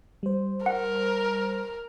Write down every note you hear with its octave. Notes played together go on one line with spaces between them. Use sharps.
G3 C5
A#4 F#5